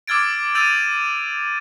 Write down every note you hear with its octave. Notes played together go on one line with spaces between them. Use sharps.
D6 E6 F6 G#6 A6 D7
E6 G6 A6 D#7 F7